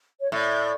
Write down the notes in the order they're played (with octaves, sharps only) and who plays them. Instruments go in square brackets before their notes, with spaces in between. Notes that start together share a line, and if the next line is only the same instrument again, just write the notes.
[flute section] C#5
[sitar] A2 [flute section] D5